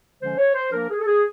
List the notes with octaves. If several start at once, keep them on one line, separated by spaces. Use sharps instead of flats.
D3 F3 G#3 C#4 C5
C#5
C5
F3 A#3 D4 A#4
G#4
A4
G#4